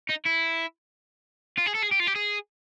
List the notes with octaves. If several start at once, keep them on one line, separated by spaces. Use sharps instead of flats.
D#4
E4
F4
G#4
A4
G#4
G4
F4
G4
G#4